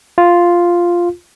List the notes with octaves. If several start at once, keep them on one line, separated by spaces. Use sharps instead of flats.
F4